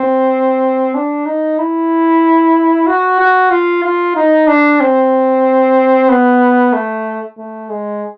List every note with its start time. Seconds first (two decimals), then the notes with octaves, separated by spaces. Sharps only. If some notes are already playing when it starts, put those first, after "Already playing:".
Already playing: C4
0.95 D4
1.26 D#4
1.58 E4
2.87 F#4
3.19 F#4
3.51 F4
3.84 F4
4.16 D#4
4.48 D4
4.80 C4
6.09 B3
6.73 A3
7.38 A3
7.70 G#3